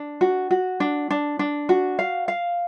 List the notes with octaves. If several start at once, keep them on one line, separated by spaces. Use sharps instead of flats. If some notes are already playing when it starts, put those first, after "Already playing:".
Already playing: D4
F#4
F#4
D4
D4
D4
F#4
F5
F5